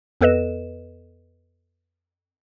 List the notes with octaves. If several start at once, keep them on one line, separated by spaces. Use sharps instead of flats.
F2 B3 A4 B4 D#5 E7